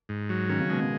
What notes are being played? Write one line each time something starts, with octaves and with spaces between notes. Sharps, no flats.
G#2
F#3
D#3 C#4
C#3
B2 G#3
C#3